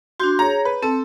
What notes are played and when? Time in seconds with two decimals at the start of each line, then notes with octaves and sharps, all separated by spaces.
0.20 D4 F#4 C6 G6
0.39 G#4 C#5 A#5
0.65 B4
0.82 C4 A4